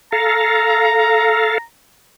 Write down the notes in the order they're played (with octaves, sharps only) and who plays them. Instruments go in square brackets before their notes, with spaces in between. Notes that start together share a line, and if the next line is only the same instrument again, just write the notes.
[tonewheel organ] A4 F5 [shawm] A#5